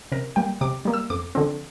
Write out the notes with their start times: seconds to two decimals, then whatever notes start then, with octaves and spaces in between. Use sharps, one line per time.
0.12 C3 A#4
0.36 G3 A#3 G5
0.61 C3 D6
0.85 G3 A#3
0.94 E6
1.10 F2 D6
1.35 D3 F3 C4